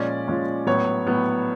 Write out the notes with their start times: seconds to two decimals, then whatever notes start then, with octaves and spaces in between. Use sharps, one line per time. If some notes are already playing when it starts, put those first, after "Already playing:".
Already playing: A#2 F3 G#3 C#4 D5
0.28 A#2 F3 G#3 C#4
0.67 A2 F#3 B3 C#5
1.06 A2 F#3 B3